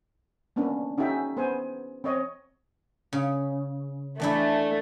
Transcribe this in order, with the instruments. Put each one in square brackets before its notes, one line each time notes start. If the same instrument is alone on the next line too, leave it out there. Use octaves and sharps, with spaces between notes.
[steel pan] A#3 B3 C#4 D4
C#4 D#4 F#4 G#4 E5 G5
B3 B4 C5 G#5
C4 C#5 D#5
[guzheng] C#3
[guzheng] E2 D4 E4 [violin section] A3